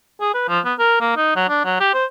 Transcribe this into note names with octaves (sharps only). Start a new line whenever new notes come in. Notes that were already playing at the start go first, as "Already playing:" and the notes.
G#4
B4
F3
B3
A#4
A#3
D#4
F#3
D4
F#3
G4
C5